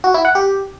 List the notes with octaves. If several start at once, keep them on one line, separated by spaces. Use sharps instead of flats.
F#4
E4
F#5
G4